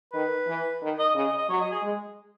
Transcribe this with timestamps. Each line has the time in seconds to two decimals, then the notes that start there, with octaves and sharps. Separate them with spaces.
0.13 D#3 B4
0.47 E3
0.82 D#3
0.99 D#5
1.15 C#3 D#5
1.27 D#5
1.37 D#5
1.49 F#3 C#5
1.61 D#5
1.71 G#4
1.83 G#3